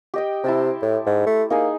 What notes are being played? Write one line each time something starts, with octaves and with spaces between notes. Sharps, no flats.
G4 D#5 G5
C3 E4 A5 C6
A2
G#2
A3
A#3 D#4 G#4 G#5